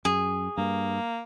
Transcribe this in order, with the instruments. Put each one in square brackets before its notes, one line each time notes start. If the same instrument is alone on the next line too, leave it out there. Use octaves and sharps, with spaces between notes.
[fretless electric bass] F#2 [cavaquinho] G#4
[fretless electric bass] G2 [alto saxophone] A#3